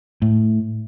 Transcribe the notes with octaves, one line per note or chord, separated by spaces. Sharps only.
A2